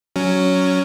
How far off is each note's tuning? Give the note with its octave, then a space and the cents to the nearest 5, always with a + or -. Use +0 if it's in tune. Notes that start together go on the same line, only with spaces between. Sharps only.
F#3 +0 C#4 +10